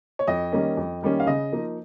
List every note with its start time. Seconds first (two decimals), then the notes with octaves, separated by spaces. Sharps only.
0.19 C#5
0.27 F2 D#5
0.52 D#3 G3 A#3 C#4
0.77 F2
1.03 D#3 G3 A#3 C#4
1.20 F5
1.27 C#3 D#5
1.52 F3 A#3 D#4